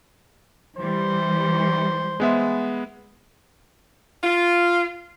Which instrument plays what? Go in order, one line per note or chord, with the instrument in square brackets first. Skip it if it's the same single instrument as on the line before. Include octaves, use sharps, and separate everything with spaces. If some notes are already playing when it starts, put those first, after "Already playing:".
[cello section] E3 G3 [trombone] C5
[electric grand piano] G#3 B3 E5
[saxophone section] F4